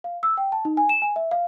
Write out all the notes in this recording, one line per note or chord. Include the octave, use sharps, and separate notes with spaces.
F5
E6
G5
A5
D#4
G#5
E7
G#5
E5
F5